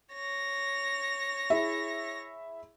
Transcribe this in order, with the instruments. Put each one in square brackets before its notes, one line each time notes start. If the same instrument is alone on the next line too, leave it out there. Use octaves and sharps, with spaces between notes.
[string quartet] C#5 A#6
[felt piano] E4 G#4 E5